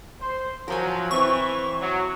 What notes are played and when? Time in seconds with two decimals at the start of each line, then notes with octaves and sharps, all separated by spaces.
0.21 C5
0.68 F3 F#3 A#4 G5 G#5
1.11 E3 C4 E4 C#6
1.80 F#3